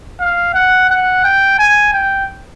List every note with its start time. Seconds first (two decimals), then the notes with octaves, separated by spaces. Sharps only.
0.20 F5
0.54 F#5
0.90 F#5
1.25 G5
1.59 G#5
1.94 G5